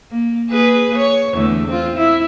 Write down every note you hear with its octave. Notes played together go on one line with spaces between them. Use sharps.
A#3
A#3 G#4 B4
C#5
E2 D3 A3
C4 F4
E4